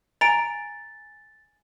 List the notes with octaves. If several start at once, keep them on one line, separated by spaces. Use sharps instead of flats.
G#5 A#5 A6 D7